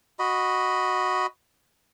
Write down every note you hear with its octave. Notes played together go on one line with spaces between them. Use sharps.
F#4 D#5 B5